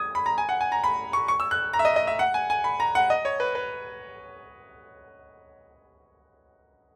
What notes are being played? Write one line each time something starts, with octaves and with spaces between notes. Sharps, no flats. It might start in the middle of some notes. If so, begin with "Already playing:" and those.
Already playing: D#6 G#6
B5
A#5
G#5
F#5
G#5
A#5
B5
C#6
C#6
E6
F#6
A#5
E5
D#5
D#5
E5
F#5
G#5
G#5
B5
A#5
F#5
D#5
C#5
B4
B4